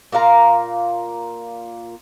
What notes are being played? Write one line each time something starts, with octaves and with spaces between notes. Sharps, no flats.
A#2 A#3 F5 A#5